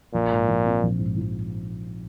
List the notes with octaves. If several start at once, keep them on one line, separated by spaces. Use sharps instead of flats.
A#1 A#2
G#2
F3
C4
A#1
G#2
F3